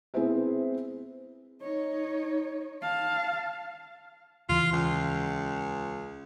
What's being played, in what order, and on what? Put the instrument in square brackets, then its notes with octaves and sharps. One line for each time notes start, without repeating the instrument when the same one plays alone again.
[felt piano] B3 C4 E4 G#4 C5 E5
[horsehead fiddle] D#4 C#5
F5 A5
[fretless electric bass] D#2 C#3 E3 [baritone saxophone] F4
[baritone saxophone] C#2